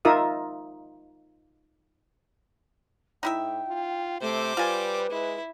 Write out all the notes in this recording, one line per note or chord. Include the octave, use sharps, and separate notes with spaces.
D#4 F4 A#4 E5 D#6
A2 D#4 E4 E5 G5
F4
C3 A3 C5 D6
G3 F4 B4 G#5
G#3 E4